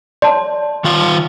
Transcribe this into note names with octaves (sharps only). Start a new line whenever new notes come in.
C#5 D5 A5 C6
D#3 F4 F5